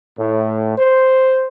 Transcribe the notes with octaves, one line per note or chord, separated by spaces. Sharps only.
A2
C5